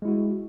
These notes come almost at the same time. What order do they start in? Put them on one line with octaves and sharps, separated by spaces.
G#3 E4 F#4